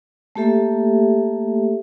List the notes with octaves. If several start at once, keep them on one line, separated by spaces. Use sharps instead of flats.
A3 A#3 G4 A4 E5